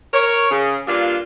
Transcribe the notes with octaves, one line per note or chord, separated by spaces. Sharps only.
A#4 C#5
C#3
G2 A#3 D4 F4